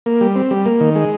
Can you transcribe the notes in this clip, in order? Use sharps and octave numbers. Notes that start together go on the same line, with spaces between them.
A#3
G3
C4
G3
A#3
D#3
G#3